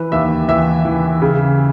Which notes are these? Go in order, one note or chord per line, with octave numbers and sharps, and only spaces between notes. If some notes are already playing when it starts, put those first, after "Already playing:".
Already playing: E3 B4
D#2 E5
E3 E5
E3
C#3